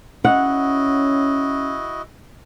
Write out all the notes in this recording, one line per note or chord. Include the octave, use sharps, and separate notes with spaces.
C#4 E4 F#4 D#5 F#5